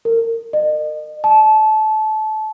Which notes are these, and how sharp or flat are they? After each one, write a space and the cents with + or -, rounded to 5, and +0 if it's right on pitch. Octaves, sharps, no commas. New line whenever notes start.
A#4 -30
D#5 -35
A5 -25